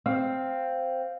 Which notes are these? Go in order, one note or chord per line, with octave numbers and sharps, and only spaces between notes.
C4 F5